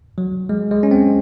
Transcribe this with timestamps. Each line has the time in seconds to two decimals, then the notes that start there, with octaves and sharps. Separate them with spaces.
0.18 F#3
0.49 G#3
0.71 G#3
0.83 C#4
0.91 C4